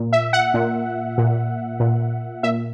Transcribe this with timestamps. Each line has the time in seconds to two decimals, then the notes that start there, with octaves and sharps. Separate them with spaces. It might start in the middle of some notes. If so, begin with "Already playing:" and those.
Already playing: A#2
0.13 E5
0.33 F#5
0.54 A#2
1.18 A#2
1.80 A#2
2.43 A#2 E5